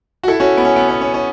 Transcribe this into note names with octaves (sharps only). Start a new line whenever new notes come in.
F#4
E4 A4
C#4 F#4
B3
C#4
B3
C#4
C#4
C#4